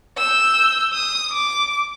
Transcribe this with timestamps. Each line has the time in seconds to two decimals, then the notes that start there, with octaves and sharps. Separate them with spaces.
0.18 E6 G6
0.93 D#6
1.33 D6